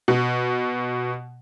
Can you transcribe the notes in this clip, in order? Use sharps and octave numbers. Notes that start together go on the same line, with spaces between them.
B2